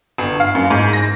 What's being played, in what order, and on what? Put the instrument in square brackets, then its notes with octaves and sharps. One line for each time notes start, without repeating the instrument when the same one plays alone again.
[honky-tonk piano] G1
F5
F#2
G#2
A#6